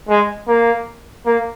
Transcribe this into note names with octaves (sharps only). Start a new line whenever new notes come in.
G#3
A#3
A#3